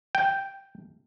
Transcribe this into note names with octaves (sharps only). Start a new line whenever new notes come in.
G5